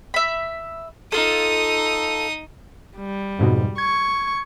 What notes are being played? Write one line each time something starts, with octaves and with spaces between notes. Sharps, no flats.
E5 B5
D#4 F4 A4 D#6
G3
F2 G#2 B2
C#6 G#6